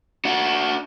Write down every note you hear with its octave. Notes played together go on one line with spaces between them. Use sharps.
D4 F#4